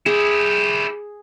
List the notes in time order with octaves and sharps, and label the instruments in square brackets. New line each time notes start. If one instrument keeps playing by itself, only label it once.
[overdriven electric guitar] E4 G4 [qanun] G#4